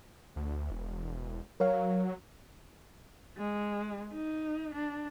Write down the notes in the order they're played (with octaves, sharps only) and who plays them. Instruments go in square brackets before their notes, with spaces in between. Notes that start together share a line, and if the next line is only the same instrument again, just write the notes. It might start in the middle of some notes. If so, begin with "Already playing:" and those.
[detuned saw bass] D2
E1
[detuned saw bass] F#3 [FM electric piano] A#4 C#5 F5
[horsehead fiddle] G#3
D#4
D4